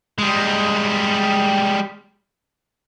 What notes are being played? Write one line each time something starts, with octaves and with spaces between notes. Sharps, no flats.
G3 G#3